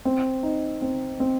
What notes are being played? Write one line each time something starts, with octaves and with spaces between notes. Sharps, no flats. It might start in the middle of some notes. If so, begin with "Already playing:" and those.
C4
D#4
C4
C4